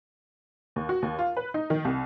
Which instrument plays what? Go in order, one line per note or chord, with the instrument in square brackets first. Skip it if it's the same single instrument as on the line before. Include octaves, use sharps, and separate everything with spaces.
[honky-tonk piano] D#2
F#4
D#2
F4
B4
D#4
D#3
C2